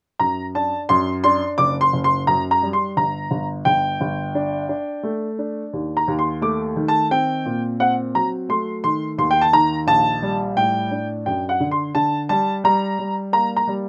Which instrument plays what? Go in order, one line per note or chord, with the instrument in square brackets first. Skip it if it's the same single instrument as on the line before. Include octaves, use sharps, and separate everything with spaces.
[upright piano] F#2 A#5
D4 A5
F#2 C6
D4 C6
F#1 D6
C6
F#1
C6
F#2 A#5
A#5
G3
C6
G1 A#5
G1
G1 G5
G1
D4
D4
A3
D4
D#2
A#5
D#2
C6
A3 D6
D#3
A5
C4 G5
A#2
C4 F#5
F#3 A#5
A3 C6
D#3 C6
D#2 C6
G5
A5
D#3 A#5
A#1 A5
G3
A2 G5
D4
F#2 G5
F#5
D3
C6
D3 A5
G3 A5
G3 A#5
G3
A#3 A#5
A#5
G3